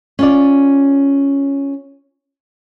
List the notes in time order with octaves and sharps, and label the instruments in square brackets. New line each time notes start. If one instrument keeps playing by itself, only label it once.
[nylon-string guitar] C#4 F4 D5